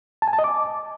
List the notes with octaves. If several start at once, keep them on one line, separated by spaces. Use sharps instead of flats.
A5
G#5
A5
D#5
D6